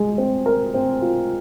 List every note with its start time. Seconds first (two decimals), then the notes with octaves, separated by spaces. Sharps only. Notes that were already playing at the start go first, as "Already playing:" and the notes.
Already playing: G#3
0.18 C4
0.46 A#4
0.74 C4
1.02 F4